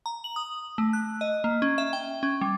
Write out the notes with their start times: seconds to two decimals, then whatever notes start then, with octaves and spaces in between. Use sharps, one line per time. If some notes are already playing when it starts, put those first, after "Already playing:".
0.06 A#5
0.24 F#7
0.36 D#6
0.78 A3
0.93 F#6
1.21 D#5
1.44 A#3
1.62 C#4
1.78 E5
1.93 G5
2.23 C#4
2.41 G3